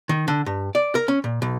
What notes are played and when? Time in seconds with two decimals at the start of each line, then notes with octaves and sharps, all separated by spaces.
0.09 D#3
0.28 D3
0.46 G2
0.75 D5
0.95 A#4
1.08 C#4
1.24 A#2
1.42 B1